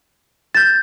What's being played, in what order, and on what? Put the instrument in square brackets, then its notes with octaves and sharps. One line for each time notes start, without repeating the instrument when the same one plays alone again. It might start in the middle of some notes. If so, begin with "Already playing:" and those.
[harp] G6 E7 [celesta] A6